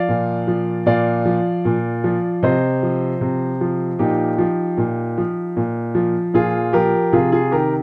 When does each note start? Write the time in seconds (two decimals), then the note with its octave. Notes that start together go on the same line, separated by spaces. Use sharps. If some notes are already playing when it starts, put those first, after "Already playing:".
Already playing: F3 D5 F5
0.09 A#2
0.48 F3
0.86 A#2 D5 F5
1.25 F3
1.65 A#2
2.04 F3
2.43 C3 C5 D#5
2.83 F3
3.21 C3
3.61 F3
3.99 A#2 D#4 G4
4.38 F3
4.78 A#2
5.18 F3
5.57 A#2
5.95 F3
6.34 A#2 F4 G#4
6.73 F3 G4 A#4
7.13 C3 F4 G#4
7.32 F4 G#4
7.51 D#3 G4 A#4